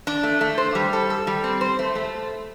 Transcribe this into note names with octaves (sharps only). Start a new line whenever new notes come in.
D4
A3
A3
C5
G3
A4
A4
G3
C4
C5
A3
A3